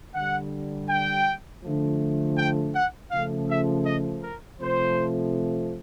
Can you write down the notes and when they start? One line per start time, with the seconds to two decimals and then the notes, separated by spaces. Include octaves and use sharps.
0.14 D3 G3 F#5
0.89 G5
1.64 D3 F3 A3
2.37 G5
2.74 F#5
3.11 C#3 F3 A3 F5
3.49 E5
3.86 D#5
4.23 A#4
4.60 C3 F3 A3 C5